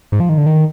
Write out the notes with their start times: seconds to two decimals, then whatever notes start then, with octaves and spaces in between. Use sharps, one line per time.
0.12 G#2
0.20 F3
0.29 D#3
0.38 D3
0.46 D#3